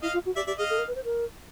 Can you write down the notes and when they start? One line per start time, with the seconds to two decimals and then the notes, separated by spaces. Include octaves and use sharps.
0.02 E4 D#5 F5
0.13 F4
0.26 F#4
0.36 G4 D5 E5
0.47 G4 D5 E5
0.58 G#4 D#5 F5
0.70 A4
0.78 A#4
0.87 B4
0.95 C5
1.04 A#4